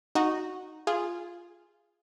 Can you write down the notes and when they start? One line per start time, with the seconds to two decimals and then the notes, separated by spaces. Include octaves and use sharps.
0.15 D#4 F#4
0.87 F4 G#4